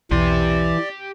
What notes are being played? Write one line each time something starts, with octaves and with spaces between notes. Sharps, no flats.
B1 E2 E3 G4 D5 C6